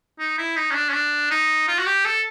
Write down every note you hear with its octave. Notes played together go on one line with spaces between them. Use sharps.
D#4
E4
D#4
C#4
D4
C#4
D4
D#4
F4
F#4
G4
A4